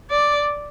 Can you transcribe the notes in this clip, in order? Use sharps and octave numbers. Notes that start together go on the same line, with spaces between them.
D5